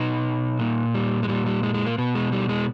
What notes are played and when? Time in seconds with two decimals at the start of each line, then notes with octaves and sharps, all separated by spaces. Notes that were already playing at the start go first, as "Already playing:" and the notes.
Already playing: B2 D#4
0.59 A#2
0.94 G3
1.23 G#3
1.28 A#2 G3
1.47 G3
1.63 G#3
1.74 G#3
1.86 A#3
1.98 B2 B3
2.15 G#3
2.32 G3
2.49 G#3